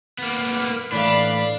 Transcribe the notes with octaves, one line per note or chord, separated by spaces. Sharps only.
A#3 B3
A2 E3 A3 D4 D5 F5 B5